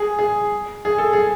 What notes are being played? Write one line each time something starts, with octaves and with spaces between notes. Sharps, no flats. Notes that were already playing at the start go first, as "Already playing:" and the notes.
Already playing: G#4
G#4
G#4
A4
G#4